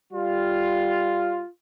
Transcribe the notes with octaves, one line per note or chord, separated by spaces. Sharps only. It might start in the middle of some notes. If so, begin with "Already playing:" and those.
G3 F4